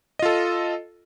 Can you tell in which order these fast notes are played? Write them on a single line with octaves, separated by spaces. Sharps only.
D#5 F4 A4